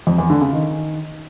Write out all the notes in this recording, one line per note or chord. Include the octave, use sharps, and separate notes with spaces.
F2
E2
D3
C#3
D#3